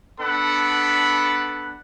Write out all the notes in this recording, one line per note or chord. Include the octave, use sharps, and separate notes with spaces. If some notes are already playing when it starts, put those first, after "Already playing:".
B3 D4 A4 F#5 B5